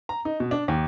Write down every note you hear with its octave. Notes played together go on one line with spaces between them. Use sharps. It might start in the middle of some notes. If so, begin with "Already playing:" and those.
A#5
D#4
B2
D4
D#2